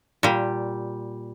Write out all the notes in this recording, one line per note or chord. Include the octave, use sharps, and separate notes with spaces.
A#2 G3